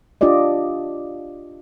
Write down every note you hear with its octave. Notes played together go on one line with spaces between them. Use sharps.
D4 F4 G4 D5 D#5